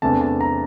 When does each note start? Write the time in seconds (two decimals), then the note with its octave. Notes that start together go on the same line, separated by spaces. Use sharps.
0.02 E2 C3 E3 A3 D4 A5
0.21 A5
0.41 A#5